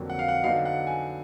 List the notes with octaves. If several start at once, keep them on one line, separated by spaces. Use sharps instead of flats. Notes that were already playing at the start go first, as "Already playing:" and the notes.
Already playing: F2 D3 F#3 A#3
F#5
F5
F#5
D3 F#3 B3 D#4 F5
F#5
G#5